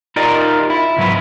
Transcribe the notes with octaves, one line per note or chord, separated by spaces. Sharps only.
D#4 F4 G4 A#4 D5 D#5
E4
C#2 G#2 F#3 B3 E4